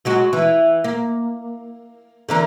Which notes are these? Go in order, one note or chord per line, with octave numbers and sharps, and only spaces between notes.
F#3 G#3 F#4
E3
A#3
D3 E3 A#4